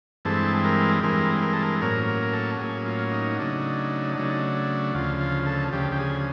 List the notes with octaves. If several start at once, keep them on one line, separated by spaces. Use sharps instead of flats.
G2 E3 G#3 C4 A4
A#4
G2 E3 G#3 C4 A#4
A#4
A4
A#4
A2 F#3 A#3 C#4 A#4
A#4
A#4
A4
A2 F#3 A#3 C#4 G#4
F4
D#4
C#3 F#3 A3 D4
C#3 F#3 A3 D4
D2 C#3 F3 F4
F4
A4
D2 C#3 F3 G4
G4
G#4